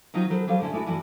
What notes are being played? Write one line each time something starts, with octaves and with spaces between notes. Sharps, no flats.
D#3 F#3 C4 D#4 F4
D#3 F#3 B3 A4 C5
F#3 G3 B3 A4 C5 F5
A2 D3 C#4 E5
G#3 A3 D4 E4 F#4
G2 E3 D4 F#4